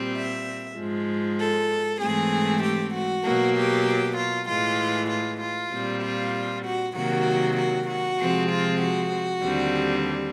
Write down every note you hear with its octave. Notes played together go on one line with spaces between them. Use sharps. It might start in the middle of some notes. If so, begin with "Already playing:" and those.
Already playing: A#2 G3 C4
E5
G#2 F3 G#3
A4
G#2 E3 A3 C4 G#4
G4
F#4
B2 F#3 A#3
G4
F4
A2 E3 G#3 F4
F4
F4
A#2 G3 C4
F4
F#4
C3 D#3 F#3 A#3 F#4
F#4
F#4
C3 F3 G#3 C4
F4
F#4
D#2 D3 G3 C4